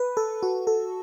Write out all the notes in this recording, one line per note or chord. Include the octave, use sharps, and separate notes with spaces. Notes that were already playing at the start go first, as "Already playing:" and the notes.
Already playing: B4
A4
F#4
A4